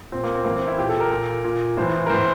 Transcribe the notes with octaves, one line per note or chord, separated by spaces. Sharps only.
A#2 C4
A#3
C4
A2 E3 A#3
C4
E4
A#2 G4
A4
A#4
A#2
A#2
A2 E3 C5
A#4
A2 E3 C5